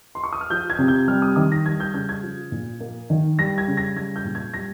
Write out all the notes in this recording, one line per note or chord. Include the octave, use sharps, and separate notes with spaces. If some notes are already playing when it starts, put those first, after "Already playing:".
C6
C#6
D#6
F6
F3 G6
G#6
C3
G6
G3 F6
D#6
D#3 D#6
A#6
G3 G#6
G6
C#3 G6
G#6
F3
A#2
A#3
D#3
G3 A#6
G#6
C#3
A#6
G3 G#6
G6
A#2
G#6
G3 A#6